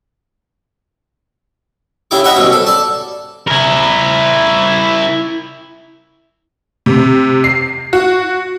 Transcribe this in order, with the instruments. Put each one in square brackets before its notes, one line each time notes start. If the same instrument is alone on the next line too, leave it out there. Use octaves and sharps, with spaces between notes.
[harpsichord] C#3 E4 G4 D6
D#5 E5 F#5 G5 B5
C2 B2 C#4
A4
D5 A5
[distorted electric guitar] E4 A#4
[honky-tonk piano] C3
C7
F#4